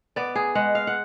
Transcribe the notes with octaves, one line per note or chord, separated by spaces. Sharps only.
B3 D5
G#4
G#3 F#5
F5
F#5